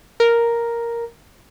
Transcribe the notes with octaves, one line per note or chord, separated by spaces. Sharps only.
A#4